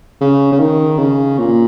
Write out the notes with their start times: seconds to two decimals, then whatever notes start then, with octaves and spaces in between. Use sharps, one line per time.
0.21 C#3
0.52 C#3
0.60 D#3
0.99 C#3
1.39 A#2